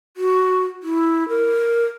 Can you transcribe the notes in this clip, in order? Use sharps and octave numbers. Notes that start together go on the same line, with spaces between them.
F#4
E4
A#4